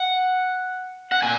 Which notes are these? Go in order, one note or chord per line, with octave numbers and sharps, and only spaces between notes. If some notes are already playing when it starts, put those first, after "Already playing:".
Already playing: F#5
F#5
A#2 G#5